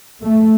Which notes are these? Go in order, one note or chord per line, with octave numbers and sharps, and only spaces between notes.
A3